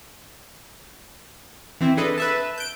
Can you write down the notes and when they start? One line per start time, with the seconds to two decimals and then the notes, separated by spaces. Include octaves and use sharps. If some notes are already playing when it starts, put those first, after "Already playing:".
1.81 E3 C4 E4
1.97 D4 G#4 A4 B4 D#5
2.18 B4 E5 A5
2.58 G6 D7